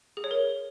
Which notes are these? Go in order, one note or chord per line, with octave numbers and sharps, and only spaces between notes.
G#4
C#5
A#4